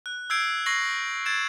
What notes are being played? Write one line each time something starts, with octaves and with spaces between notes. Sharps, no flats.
F#6
E6 G6 G#6 C7 D7
C#6 A#6 C7 F#7
G#6 A6 D7 E7